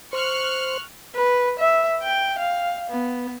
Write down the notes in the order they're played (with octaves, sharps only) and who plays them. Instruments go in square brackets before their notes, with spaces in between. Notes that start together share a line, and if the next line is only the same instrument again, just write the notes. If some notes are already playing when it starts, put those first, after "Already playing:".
[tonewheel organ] C5 [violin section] C#6 F6 F#6
[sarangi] B4
E5
G5
F5
B3